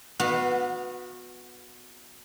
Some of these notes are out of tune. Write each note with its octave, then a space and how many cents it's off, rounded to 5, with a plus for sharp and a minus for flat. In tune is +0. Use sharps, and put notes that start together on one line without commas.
B3 +0 F#4 -25 F5 +0